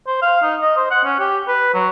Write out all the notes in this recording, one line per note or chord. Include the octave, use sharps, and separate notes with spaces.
C5
F5
D#4
D#5
C5
F#5
C#4
G4
B4
F#3